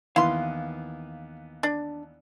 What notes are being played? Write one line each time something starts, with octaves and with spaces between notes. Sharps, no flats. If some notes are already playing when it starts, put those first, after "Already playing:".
D#2 E3 B3 E4 F5 C6
D4